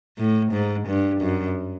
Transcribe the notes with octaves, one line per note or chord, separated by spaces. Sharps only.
A2
G#2
G2
F#2